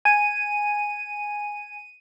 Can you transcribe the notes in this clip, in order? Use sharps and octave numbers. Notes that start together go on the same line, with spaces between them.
G#5 D#7